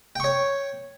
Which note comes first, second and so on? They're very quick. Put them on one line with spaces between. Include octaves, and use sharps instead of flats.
G5 C#6 C#5